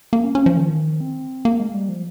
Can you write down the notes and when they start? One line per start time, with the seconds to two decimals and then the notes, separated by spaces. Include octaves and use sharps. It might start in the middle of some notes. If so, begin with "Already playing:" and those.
0.13 A#3
0.24 C#4
0.35 C#4
0.46 F3
0.57 D#3
1.01 C4
1.45 A#3
1.59 G#3
1.74 G3
1.89 F3